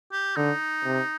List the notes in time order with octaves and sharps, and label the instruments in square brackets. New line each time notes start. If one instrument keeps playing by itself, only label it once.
[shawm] G4
[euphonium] D3 [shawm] D#4
[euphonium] C3